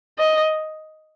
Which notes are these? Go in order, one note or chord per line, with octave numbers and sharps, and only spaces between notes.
D#5